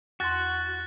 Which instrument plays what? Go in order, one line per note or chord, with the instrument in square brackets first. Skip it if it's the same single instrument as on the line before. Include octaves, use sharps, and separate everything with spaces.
[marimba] E2 C6 [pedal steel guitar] F#4 [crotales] F#6 A6 A#6